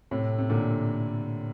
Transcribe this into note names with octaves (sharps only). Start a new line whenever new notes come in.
A2 C3
C3
A#2 D3